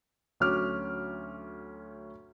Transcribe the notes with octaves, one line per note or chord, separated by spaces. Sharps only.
D2 F#3 C#4 D6 F6